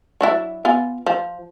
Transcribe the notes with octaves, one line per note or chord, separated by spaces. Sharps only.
F#3 D4 E4
B3 F4 G#5
F3